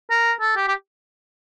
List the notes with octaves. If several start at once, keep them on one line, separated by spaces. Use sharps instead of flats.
A#4
A4
G4
G4